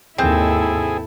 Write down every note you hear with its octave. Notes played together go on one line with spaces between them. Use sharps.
D#2 G#2 C3 C4 E4 G#4 A4